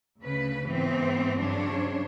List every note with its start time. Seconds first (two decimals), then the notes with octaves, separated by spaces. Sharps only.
0.22 D2 C#3 B4
0.66 G#2 E3 B3 C4
1.40 G2 C#3 F#3 D4 C5 C#5